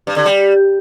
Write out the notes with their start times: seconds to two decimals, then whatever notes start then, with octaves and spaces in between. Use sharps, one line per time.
0.07 G2
0.16 D3
0.26 G3